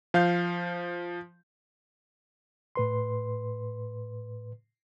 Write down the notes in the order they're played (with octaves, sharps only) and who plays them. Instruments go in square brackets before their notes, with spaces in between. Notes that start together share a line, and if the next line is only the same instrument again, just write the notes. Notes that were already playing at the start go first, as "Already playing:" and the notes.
[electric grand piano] F3 F5 G6
[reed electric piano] A2 B4 C6